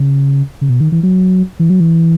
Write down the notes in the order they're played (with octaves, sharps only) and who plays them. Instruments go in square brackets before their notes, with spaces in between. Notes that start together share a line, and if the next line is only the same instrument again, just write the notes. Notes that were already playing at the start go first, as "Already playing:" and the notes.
Already playing: [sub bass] C#3
C#3
B2
D#3
E3
F#3
E3
F#3
E3